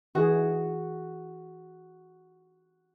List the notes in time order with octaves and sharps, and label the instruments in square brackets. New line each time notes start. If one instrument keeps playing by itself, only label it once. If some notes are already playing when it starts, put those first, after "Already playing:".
[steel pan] E3 G#4 [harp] F#4